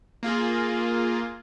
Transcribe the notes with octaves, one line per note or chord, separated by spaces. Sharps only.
A#3 F4 G#4